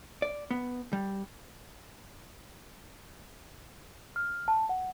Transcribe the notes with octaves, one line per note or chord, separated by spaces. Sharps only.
D5
B3
G3
F6
A5
F#5